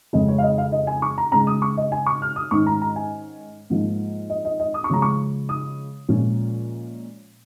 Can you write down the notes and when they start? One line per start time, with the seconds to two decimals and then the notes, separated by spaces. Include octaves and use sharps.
0.13 F2 C#3 G#3 D#5
0.28 C#5
0.38 F5
0.43 D#5
0.58 F5
0.72 D#5
0.87 G#5
1.02 C#6
1.18 A#5
1.32 C#3 G#3 C#4 A#5
1.47 D#6
1.62 C#6
1.77 D#5
1.92 G#5
2.06 C#6
2.22 F6
2.36 D#6
2.51 G#2 D#3 C#4 C#6
2.66 A#5
2.82 A#5
2.96 G#5
3.70 G#2 F3 A#3
4.30 D#5
4.45 D#5
4.60 D#5
4.74 D#6
4.84 C#6
4.90 C#3 F3 G#3 A#5
5.02 C#6
5.49 D#6
6.08 A#2 F3 G#3 C#4